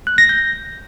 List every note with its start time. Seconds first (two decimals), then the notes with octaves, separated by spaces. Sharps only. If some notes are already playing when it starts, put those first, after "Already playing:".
0.07 F#6
0.18 A#6
0.29 G6